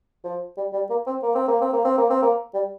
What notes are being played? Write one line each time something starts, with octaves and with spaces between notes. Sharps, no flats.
F3
G3
G3
A#3
C4
A#3
C4
A#3
C4
A#3
C4
A#3
C4
A#3
G3